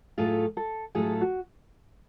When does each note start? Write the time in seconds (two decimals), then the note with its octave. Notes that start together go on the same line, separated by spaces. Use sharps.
0.18 A2 F#3 A3 F4 G#4 A4
0.57 A4
0.95 A2 F#3 A3 F4 G#4 A4
1.21 F#4